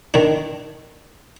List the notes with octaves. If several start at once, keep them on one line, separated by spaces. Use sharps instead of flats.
D#3 D4